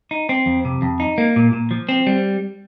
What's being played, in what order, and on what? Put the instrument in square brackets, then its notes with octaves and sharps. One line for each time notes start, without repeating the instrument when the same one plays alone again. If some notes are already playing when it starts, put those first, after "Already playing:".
[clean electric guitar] D#4
C4
F2
C3
F2
D#4
A#3
A#2
A#2
F3
C4
G3